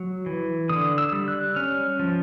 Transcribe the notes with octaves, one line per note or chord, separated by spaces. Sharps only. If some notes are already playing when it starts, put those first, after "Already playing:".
Already playing: F#3
E3
D3 D#6
E6
G3
F#6
C#4 F6
F3